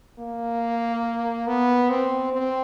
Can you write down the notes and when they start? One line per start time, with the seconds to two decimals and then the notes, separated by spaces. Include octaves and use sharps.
0.19 A#3
1.47 B3
1.90 C4
2.33 C4